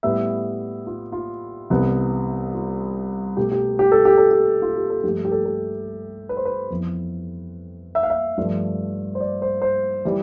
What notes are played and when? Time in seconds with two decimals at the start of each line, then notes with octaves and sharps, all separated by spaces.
0.03 A2 G3 B3 E5
0.87 F4
1.12 F4
1.70 C2 C3 E3 B3
2.54 F4
3.37 B2 A3 G4
3.51 G4
3.79 G4
3.92 A4
4.05 G4
4.18 A4
4.31 G4
4.62 F4
4.76 G4
4.90 A4
5.03 G2 F3 A3 G4
5.25 G4
5.32 A4
5.46 A4
6.29 B4
6.37 C5
6.45 B4
6.70 F2 E3 B3
7.95 E5
8.03 F5
8.10 E5
8.38 G2 F3 A3
9.15 C5
9.21 D5
9.42 C5
9.62 C5
10.05 E3 G3